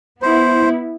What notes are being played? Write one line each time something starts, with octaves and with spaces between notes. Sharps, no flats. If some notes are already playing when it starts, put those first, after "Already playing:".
B3 E4 C5